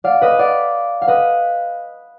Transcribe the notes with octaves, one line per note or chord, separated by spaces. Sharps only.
D5 F5
B4 D#5
D5 F5
F5
B4 D#5